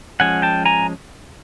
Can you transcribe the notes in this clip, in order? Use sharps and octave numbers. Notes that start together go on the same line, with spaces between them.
F3 G#3 C#4 F#5 G#5
G5 A5
G#5 A#5